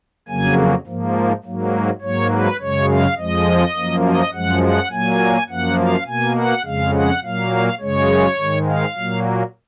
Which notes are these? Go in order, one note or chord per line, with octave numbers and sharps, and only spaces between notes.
F2 C#3 F#3 A#3 G#5
G#2 F3 A#3
G#2 F#3 A#3
G#2 F#3 A#3 C#5
B4
F#2 C#3 G#3 C#5
F5
F2 F3 G#3 D#5
F#2 F3 A#3
D#5
F#2 F3 G#3 F#5
F#5
A#2 F#3 A#3 G#5
F#2 F3 A#3 F#5
F5
B2 A#3 G#5
F#5
F2 C#3 G#3 F5
F#5
A#2 F#3 A#3 F5
F#2 C#3 G#3 C#5
G#2 D#3 G#3
F5
A#2 F#3 A#3